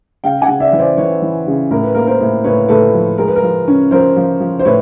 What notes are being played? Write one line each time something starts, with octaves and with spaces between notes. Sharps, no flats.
C#3 F5 G5
F#5 G#5
C#3
D5 E5
E3
C5 D5
E3 B4 C#5
E3
C#3
A2 A#4
B4
A#3 A#4
A#4 C5
A2
A2 B4 C#5
A2 A4 B4
F3
G#3 A#4
B4
A#4
F3
C#4
F3 A#4 C5
F3
F3
C5
A2 B4 C#5